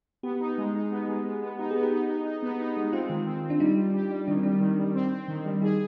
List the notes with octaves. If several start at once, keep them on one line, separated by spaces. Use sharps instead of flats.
B3 G4
D#4
G#3
D#4
B3
G#3
B3
B3
D#4 G4
B3 G#4
G4
D#4
D#4
D#4
B3
D#4
G#3
C4 F4
D#3
C4
C4
D4
G3 D#4
G3
G4
G3
D#3 D4
C4
G3 D4
D#3 D#4
G3
C4
C4
D#3
G3
D#4 G#4